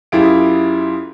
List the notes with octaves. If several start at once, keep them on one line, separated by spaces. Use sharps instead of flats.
F#2 E4 F4 G4 G#4 D7